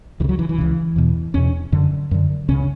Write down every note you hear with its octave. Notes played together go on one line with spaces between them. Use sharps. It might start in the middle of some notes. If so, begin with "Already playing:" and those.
C#2 C#3 E3
F#3
E3
E3
C#2 C#3
E2 B2
E2 B2 C#4
F#2 D3
F#2 D3
C#2 C#3 C#4